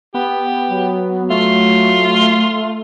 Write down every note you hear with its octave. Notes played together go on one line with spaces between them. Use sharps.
B3 G4
F#3
A3 F4